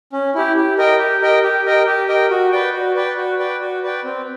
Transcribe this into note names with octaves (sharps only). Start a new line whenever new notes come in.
C#4
E4 G4
G4
A#4 D#5 G5
G4
A#4 D#5 G5
G4
A#4 D#5 G5
G4
A#4 D#5 G5
F#4
B4 D5 G5
F#4
B4 D5 G5
F#4
B4 D5 G5
F#4
B4 D5 G5
C4